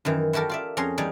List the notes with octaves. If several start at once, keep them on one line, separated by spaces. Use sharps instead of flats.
F#2 D#3 E3
E4 F#4 G4 A4 A#4
F4 D5 E5
F2 C#4 G#4 A#5 C6
E2 G3 D#4 D5 G#5